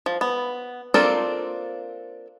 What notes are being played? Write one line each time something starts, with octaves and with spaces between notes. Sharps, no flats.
F3
B3
A#3 C4 D4 F4 A4